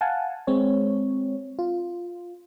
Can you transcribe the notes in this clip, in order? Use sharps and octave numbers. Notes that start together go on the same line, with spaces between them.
F5 F#5 G#5 A5
G#3 C4 C#5
F4